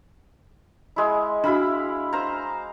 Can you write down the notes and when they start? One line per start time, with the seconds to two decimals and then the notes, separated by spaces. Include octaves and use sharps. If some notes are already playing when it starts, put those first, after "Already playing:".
0.96 G#3 E4
1.44 D4 E4 F#4 F5 B5
2.13 C5 F5 A#5